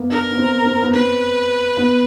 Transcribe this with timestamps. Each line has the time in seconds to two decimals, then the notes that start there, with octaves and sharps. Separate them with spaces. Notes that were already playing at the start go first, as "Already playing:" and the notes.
Already playing: A#3 B3
0.10 D4 A#4
0.31 B3
0.38 C4
0.65 C4
0.82 B3
0.94 C4 B4
1.77 B3